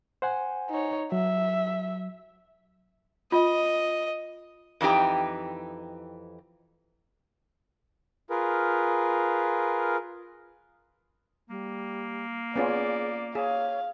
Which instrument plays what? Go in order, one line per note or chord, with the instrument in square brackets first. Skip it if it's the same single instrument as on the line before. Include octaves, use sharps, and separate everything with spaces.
[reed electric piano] C5 F#5 G#5
[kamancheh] D#4 C#5
[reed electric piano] F#3 [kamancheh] E5
[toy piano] F4 [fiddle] D#5
[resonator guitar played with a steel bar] F2 E3 D#4 G4 G5
[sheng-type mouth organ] F4 G#4 A#4 B4
[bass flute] G3 [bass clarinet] A#3
[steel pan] B3 C#4 F4 [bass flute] G#4 [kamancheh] D5
[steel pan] G#4 [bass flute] C#5 [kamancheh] F5